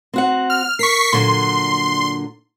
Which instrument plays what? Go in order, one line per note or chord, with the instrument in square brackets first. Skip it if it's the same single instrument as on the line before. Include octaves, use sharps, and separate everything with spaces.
[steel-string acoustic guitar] C4 F#4 F#5
[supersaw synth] F6
[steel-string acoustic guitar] A#4 [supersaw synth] C#6 B6 C7
[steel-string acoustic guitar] A#2 D3 F#3 [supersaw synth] C6